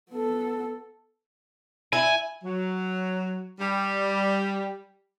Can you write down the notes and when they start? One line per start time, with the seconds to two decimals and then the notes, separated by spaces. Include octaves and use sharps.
0.11 B3 A4
1.93 E4 G#5
2.44 F#3
3.60 G3